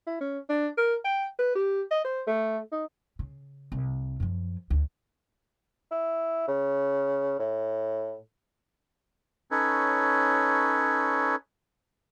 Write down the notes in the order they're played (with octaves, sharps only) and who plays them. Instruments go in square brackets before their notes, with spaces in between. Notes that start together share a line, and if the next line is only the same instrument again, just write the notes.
[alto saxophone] E4
C#4
D4
A#4
G5
B4
G4
D#5
C5
A3
D#4
[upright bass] C#3
C2
F#2 F3
D2
[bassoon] E4
C#3
A2
[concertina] C#4 D#4 A4 B4 C#5